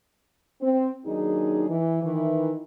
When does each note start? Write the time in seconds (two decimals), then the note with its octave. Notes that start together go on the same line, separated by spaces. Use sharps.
0.61 C4
1.06 D#2 F#3 D4 D#4 G#4
1.69 E3
2.03 D#3 E3